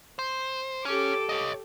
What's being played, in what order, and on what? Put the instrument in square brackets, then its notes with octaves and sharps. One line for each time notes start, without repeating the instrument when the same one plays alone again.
[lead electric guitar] C5
[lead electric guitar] C#4 [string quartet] G4 A4 D6
[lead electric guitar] C#5 D#5